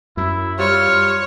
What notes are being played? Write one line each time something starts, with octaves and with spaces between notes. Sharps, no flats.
F#2 E4
G3 F4 C#5